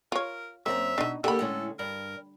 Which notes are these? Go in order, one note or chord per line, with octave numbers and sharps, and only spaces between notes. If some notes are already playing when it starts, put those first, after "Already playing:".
F4 A#4 C#5
F#2 A#3 C4 E5 A#5
B2 D4 D#4
D3 A#3 G4 A4 B5
A2 G#3 C#4
G2 A#4